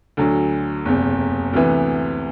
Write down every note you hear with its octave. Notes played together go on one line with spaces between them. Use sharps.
D2 D3 F#3
F#1 E2 C3
D2 C3 E3 B3